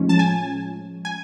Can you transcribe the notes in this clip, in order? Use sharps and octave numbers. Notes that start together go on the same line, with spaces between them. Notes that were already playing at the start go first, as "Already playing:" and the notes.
Already playing: A2 F3 G#3 C#4
A5
G#5
G#5